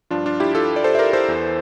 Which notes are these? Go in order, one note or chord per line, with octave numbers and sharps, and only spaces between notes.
G2 F3 D4 F4
D4 F4
E4 G4
F4 A4
D5
A4 C5
E5
A#4 D5
A4 C5
E2 E3